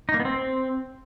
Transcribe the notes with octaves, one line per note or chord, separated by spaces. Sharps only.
D#4
A#3
B3
C4